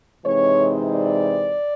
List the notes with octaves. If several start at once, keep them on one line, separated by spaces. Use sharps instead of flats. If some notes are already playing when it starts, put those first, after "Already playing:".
C3 E3 G#3 C4 D#4 C#5
D5